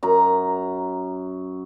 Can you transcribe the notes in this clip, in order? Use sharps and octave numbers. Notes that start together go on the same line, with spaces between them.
F#2 A#5